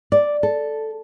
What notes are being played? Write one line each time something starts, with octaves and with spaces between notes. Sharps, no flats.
D5
A4